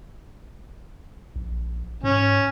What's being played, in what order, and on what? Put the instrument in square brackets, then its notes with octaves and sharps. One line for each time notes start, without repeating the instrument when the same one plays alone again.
[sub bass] A#1
[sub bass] G#2 [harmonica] C#4